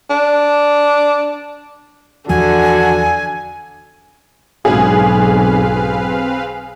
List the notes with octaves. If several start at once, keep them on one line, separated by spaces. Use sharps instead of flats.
D4
E2 D3 E3 F3 F#4 G#5
B1 G#2 D3 F#3 C4 G#4 B4 F5